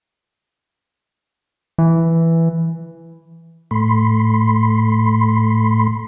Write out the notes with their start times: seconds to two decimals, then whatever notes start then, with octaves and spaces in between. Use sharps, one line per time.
1.78 E3
3.71 A2 A3 B5 C6